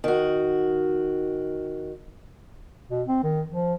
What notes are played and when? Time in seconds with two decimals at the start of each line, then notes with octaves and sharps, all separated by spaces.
0.04 D#3 F#4
2.90 B2
3.08 C4
3.23 D#3
3.50 F3